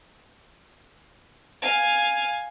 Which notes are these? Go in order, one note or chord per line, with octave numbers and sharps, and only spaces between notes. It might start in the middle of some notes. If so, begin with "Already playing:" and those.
F5 G#5